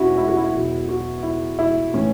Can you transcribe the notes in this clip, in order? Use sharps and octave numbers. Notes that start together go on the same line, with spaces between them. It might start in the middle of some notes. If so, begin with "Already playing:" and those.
Already playing: E2 B2 F#3 C#4 E4 F#4
E4
F#4
E4
E2 B2 F#3
F#4
E4
E4
A2 E3 C#4